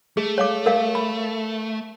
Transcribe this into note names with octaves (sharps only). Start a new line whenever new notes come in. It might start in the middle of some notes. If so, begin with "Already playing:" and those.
A3 G#4
C#5 F5 D6
A#4 F5
B5